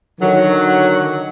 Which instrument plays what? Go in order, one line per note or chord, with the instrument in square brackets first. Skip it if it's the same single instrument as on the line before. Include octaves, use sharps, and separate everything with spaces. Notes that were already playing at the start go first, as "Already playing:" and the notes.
[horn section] D3 D#3 F#3